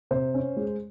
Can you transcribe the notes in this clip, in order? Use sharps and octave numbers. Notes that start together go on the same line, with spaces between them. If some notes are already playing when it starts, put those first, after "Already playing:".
C3 C5
C#4
G#3